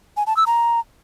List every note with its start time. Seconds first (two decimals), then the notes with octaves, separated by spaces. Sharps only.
0.17 G#5
0.27 A5
0.37 E6
0.47 A#5